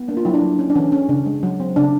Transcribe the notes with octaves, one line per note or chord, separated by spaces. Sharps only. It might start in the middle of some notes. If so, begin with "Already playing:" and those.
Already playing: B3
A#3 D4
F4
F#3 E4
D4
F#3
C#4
D4
E3 C#4
C#4
C#3 D4
G#3
F#3
C4
C#3 D4